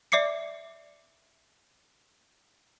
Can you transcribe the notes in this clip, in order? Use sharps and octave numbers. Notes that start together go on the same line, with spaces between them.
D5 E5 D6 C7 C#7